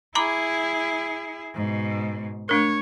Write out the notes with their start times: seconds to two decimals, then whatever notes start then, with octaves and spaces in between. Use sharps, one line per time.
0.15 E4 G#4 A#5 B5 D6
1.54 G#2 B2
2.49 A3 D4 A#4 C#5